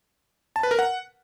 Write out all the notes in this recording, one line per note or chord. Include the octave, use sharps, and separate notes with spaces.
A5
B4
A#4
F#5